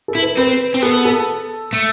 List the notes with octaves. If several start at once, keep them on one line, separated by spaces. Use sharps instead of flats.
A4
E4
B4
C4 B4
C4
B3 A4
A4
A3